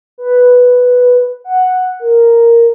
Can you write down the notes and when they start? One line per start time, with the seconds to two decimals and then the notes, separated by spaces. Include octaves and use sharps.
0.18 B4
1.44 F#5
2.00 A#4